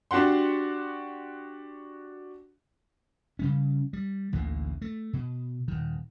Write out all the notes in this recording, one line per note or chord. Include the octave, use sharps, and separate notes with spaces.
D4 F#4 G4 F#5 C6
C#3 G3 C#4
G3
A1 D2 D3 A#3
A3
B2
D#1 D#3